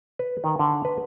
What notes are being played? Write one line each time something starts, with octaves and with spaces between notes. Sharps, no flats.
B4
D#3
D3
B4